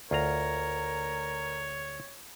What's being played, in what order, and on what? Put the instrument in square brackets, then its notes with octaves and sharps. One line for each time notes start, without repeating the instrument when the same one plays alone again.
[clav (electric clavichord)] D2 F4 A#5 [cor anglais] A#4 [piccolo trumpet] C#5